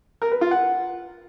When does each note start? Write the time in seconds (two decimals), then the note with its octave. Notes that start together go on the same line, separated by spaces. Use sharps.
0.22 A#4
0.31 B4
0.41 F4
0.51 F#5